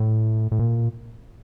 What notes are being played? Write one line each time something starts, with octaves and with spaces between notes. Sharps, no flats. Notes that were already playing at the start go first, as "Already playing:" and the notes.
Already playing: A2
A2
A#2